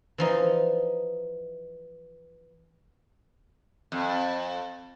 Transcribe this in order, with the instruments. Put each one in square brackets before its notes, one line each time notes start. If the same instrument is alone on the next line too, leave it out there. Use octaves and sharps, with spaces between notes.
[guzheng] E3 F3 D#4
[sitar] F2